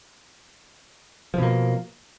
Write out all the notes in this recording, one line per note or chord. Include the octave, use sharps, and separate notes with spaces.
B2 F3 A#3